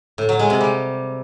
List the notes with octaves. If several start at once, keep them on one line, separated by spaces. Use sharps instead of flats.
A2
F#3
G#3
C3
G3